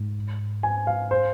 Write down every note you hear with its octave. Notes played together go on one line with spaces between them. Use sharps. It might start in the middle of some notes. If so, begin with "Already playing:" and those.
Already playing: G#2
G#5
F5
C5